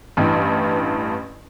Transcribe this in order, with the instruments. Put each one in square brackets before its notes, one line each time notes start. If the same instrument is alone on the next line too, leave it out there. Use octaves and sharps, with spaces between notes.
[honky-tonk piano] A1 G2 E3